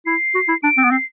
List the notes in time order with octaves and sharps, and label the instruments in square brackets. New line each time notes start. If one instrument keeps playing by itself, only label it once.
[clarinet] E4 [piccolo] C7
[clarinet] F#4
E4
[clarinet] D4 [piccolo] D7
[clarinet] C4
B3
[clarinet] C4 [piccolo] C7